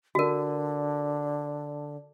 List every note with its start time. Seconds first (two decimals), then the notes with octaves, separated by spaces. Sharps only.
0.15 D3 F#4 A#4